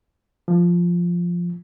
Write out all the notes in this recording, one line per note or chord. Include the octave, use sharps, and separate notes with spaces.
F3